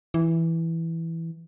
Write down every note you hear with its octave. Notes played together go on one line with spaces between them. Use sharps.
E3